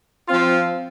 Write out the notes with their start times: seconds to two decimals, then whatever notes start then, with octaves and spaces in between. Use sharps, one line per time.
0.28 F3 C4 F4